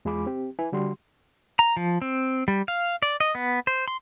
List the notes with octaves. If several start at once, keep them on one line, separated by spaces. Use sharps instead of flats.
E2 G#3 F4 G#4 B5 D6
C4 G4
E4 B4 G#5
D3 G3 F#4 C6
A#5
F3
C4
G3
F5
D5
D#5
B3
C5
C6